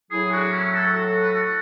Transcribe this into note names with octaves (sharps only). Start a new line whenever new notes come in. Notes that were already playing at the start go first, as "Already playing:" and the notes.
A2 F#3 E4 G#4
D4 F#4
C#4 E4
F#4 A4
F#4 A4
B4
F#4 A4